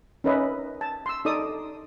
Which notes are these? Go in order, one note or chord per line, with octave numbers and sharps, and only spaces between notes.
C#4 D#4 A#4 B4 D#5 E5
A5
C6 E6
D#4 A4 D5 D#6